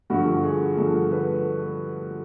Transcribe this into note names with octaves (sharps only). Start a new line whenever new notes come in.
G2 D3 F3 F#4
G#4
G2 D3 F3 A4
B4